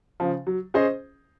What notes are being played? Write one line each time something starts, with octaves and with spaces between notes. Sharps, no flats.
C#3 F3
F#3
C#4 G#4 C5 D#5